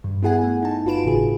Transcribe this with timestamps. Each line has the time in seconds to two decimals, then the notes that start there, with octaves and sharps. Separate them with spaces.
0.04 G2
0.23 B3 E4 G#4 F#5 G#5
0.44 A3
0.62 D#4 A5
0.85 G1 F4 F#4 B4 D7 E7
1.04 G#1 A2 C#3 G#4